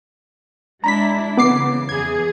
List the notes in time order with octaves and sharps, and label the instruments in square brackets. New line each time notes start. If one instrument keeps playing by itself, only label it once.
[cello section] G#3 D4 E4 [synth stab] A#5 B5 B6
[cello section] C#3 E3 [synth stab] B3 D6 C7
[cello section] E2 E3 G#4 [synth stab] G#6